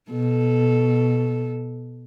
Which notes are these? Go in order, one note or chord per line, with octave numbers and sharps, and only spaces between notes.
B2 A4